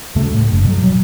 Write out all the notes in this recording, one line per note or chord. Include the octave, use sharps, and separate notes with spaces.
D2 C#3 A3
A2
F#1
B2 F#3
F#3